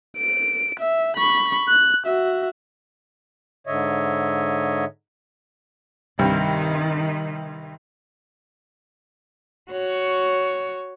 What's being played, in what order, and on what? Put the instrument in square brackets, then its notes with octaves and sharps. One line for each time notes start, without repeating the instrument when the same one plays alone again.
[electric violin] D7
E5
B5 C#6
F#6
F#4 E5
[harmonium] G#2 D3 C#5 D#5 E5
[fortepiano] C2 G2 [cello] D#3
[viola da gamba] F#4 C#5